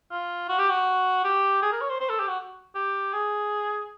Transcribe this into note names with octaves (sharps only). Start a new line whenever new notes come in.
F4
F#4
G4
F#4
G4
G#4
A#4
C#5
C5
C5
A4
G4
F#4
G4
G#4